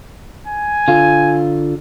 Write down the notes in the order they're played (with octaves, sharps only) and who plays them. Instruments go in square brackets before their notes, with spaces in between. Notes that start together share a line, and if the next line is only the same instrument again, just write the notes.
[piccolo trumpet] G#5
[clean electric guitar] D3 F4